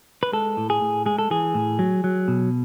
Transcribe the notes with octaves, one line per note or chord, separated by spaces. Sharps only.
B4
G#3 A4
A2
G#4
A2
G#3 G#4
A4
E3 G#4
A2
F#3
F#3
B2